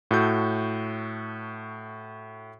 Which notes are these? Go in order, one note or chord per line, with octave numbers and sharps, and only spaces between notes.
A2 F#4 A4 G6